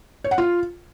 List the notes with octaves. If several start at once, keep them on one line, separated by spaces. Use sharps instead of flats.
C#5
F#5
F4